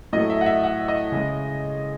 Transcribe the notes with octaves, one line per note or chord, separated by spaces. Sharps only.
A2 F#3 A3 D#5
E5
F#5
E5
F#5
D#5
C#3 G#3